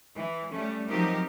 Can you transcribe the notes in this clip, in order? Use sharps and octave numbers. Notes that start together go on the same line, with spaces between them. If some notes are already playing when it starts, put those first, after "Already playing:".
E3
G3 A3 C#4
F3 F#3 C4 D#4 G4 A#4